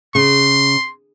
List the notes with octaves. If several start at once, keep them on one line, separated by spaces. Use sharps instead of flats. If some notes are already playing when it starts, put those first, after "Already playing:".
C#3 C6